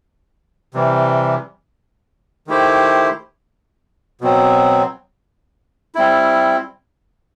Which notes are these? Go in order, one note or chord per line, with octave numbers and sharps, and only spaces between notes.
C3 E3 G3
D#3 A3 E4 G4 C5
B2 F#3 C4
G3 C4 E4